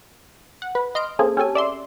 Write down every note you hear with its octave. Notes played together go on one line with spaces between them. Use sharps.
F#5
B4
D#5 C6 F6 D7
A#3 C4 C#4 G#4 A4
C#4 G4 A4 G#5
D5 E5 C6